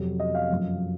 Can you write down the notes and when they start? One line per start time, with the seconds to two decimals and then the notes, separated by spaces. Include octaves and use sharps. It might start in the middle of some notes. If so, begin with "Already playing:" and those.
Already playing: F2 C3 F#3
0.20 D#5
0.35 F5
0.50 F#2 F3